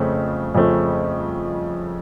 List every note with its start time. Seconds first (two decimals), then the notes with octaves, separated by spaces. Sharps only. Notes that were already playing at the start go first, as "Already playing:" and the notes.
Already playing: F2 C#3 F3 A3 C4
0.55 F2 C#3 F3 A3 C4